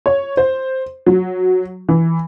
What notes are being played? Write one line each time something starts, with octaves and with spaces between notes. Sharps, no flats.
C#5
C5
F#3
E3